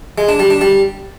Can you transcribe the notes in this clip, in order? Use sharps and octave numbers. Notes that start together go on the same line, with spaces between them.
G#3
D4
G3
D4
G3